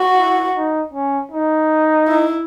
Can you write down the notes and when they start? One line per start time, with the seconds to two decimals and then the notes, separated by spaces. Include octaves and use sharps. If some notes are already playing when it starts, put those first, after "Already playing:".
Already playing: F#4
0.18 E4
0.56 D#4
0.93 C#4
1.32 D#4
2.07 E4